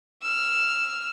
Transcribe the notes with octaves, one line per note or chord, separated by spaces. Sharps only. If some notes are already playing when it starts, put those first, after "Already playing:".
E6 F6